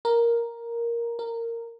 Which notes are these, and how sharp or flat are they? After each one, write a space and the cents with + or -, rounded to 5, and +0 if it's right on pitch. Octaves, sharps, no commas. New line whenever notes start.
A#4 +5
A#4 -15